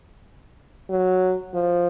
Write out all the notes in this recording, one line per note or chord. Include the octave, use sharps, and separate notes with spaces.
F#3
F3